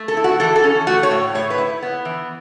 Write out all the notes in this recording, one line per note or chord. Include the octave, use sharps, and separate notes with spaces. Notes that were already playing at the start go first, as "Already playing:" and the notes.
Already playing: A3
A4
E4
F#4
E3 A4
A4
C#4
A3 F#4
C#5
A2
A2 C#5
B4
E4
B3
E3